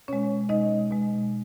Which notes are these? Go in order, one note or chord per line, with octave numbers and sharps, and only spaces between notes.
B2 G#3 C#4 C#5
B2 G#3 D#4 D#5
B2 G#3